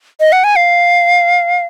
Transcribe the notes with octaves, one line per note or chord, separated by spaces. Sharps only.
D#5
F#5
G#5
F5